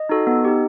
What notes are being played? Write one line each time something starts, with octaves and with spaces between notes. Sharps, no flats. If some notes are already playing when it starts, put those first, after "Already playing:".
Already playing: D#5
D#4 F#4 A4
B3
D#4 G4